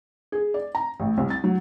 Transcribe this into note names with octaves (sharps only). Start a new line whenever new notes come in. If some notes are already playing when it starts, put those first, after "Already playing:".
G#4
D5
A#5
A1
C2
A6
F#3